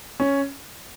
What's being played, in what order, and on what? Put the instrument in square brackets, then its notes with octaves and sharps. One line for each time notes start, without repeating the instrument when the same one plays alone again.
[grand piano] C#4